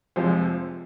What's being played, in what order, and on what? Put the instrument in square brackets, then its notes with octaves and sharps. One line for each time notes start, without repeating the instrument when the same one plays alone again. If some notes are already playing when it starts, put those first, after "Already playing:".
[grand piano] F1 F2 C3 F3 G#3 C5